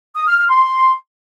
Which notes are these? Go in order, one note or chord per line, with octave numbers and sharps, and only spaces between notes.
D#6
F6
F6
C6